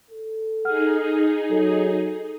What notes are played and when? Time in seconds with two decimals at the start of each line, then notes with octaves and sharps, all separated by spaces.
0.11 A4
0.65 D#4 G#4 F#5 F6
1.51 F#3 A4